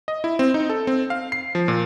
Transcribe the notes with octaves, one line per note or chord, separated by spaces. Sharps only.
D#5
E4
C4
D#4
A4
C4
F5
C7
F3
A#2